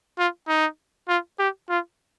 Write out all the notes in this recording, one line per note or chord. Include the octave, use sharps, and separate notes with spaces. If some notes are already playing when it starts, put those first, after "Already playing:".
F4
D#4
F4
G4
F4